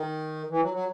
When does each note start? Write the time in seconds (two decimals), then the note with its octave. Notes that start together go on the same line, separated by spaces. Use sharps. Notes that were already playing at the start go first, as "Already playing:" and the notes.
Already playing: D#3
0.50 E3
0.62 F#3
0.74 F#3